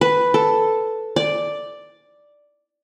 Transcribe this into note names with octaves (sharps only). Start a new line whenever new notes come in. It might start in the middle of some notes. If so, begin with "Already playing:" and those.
B4
A4
D5